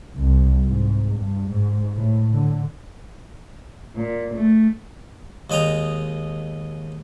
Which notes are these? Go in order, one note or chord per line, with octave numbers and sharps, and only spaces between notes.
C2
G#2
G2
G#2
A2
D3
A#2
A3
D#2 G#3 D#5 G5 A#5